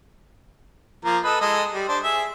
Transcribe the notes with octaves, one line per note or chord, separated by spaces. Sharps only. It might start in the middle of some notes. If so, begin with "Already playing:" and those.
F3 A#3 A#4
A4 B4 D#5
G#3 A4 D#5
G3
D4 C5
G#4 E5